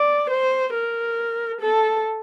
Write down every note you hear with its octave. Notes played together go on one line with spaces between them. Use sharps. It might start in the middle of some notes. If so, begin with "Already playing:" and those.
Already playing: D5
C5
A#4
A4